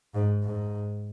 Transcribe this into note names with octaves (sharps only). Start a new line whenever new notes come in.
G#2
G#2